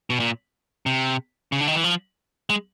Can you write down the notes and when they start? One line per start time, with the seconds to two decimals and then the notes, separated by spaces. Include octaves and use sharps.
0.10 B2
0.20 A#2
0.86 C3
1.52 C#3
1.61 D3
1.67 D#3
1.76 E3
1.84 F3
2.50 G#3